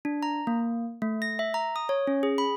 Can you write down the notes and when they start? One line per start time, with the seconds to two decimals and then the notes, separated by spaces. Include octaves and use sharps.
0.05 D4
0.23 A#5
0.47 A#3
1.02 A3
1.22 A#6
1.39 E5
1.54 A#5
1.76 D#6
1.89 C#5
2.07 C#4
2.23 G#4
2.38 B5